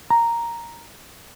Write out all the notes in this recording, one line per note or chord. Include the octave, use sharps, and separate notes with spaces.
A#5